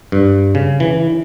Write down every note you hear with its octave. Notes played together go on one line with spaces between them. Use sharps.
G2
C#3
E3